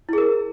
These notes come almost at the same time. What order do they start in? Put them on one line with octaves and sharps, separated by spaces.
E4 G#4 A#4